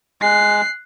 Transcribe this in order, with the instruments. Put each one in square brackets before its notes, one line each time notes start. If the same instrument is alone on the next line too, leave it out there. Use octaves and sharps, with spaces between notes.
[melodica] G#3 [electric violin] F#6 C7